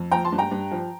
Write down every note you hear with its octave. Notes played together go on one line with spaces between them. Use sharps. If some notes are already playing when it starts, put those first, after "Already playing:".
Already playing: F2
F3 G5 A#5
A5 C6
G2
G5 A#5
G2
F3